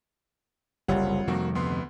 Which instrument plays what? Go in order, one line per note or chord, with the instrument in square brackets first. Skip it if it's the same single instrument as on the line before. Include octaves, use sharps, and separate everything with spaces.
[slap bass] F#1 C2 [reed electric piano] G3 [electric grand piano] F4 C#5 F#5
[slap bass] F2 C3 D#3 [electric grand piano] A#3 F#4
[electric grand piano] D2 B3 C6